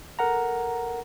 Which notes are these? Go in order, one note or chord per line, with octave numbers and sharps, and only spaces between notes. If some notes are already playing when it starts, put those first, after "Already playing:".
A4 A#4 F#5 A#5